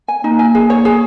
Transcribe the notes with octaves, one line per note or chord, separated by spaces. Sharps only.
G#5
A#3 D#4
G#5
G#4
C#5
G#4